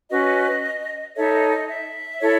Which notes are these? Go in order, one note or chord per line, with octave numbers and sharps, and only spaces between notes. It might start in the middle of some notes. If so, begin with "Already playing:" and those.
C#4 F#4 B4 D#5
D#4 A4 C#5 E5
D#5
D#5
E5
E4 A4 C#5